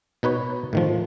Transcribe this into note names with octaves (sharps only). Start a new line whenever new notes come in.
B2 D#4 B4 C#5
A2 D#3 F3